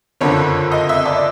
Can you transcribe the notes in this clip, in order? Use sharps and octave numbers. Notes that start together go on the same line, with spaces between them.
F#1 F2 D3 F3 C#5
D#5
E5
D5